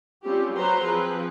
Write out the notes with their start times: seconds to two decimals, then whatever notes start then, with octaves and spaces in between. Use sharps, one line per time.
0.23 G3 C4 C#4 F4 G4
0.54 F#3 F#4 B4 C5 A#5 C6
0.83 F3 C4 G#4 B4